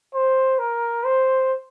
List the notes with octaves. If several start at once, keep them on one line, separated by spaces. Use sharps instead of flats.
C5
A#4
C5